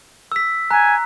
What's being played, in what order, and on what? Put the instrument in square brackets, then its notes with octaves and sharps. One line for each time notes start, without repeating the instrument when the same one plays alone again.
[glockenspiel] E6 B6
[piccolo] G#5 [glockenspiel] A#5 F#6